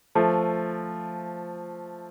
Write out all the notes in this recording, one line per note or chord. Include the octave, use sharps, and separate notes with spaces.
F3 A3